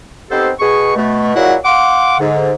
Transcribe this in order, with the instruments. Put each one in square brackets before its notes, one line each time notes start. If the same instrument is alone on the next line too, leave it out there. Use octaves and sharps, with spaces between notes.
[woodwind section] B3 C4 D#4 G4 A4 C5
B2 G#4 C#6
B2 A3
A#2 F#3 G#3 E4 F#4 F#5
F5 F#5 C6 D6
G#2 D3